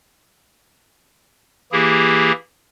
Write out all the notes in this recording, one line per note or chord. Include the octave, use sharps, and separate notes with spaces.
E3 A#3 E4 G4 G#4